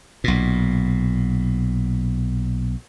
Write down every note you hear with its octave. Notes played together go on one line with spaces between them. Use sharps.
B1 A#2